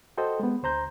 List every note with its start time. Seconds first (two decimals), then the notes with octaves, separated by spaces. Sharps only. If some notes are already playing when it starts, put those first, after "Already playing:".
0.17 F#4 A4 C5 D#5 G5
0.40 G#3 B3
0.63 D2 C5 A#5 G6